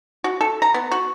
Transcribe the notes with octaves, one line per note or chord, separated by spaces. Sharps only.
F#4
A4
A#5
B3
F#4